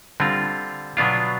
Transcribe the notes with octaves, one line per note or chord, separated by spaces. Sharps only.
D3 G3 C4 F4
B2 F#3 B3 D4 F4